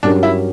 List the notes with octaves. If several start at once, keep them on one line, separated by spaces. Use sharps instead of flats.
G2 F#3 C#4 D4 G4 A#4
E4